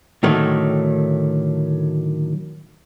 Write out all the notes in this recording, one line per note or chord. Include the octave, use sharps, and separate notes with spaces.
A2 D3 D#3 F#3 A3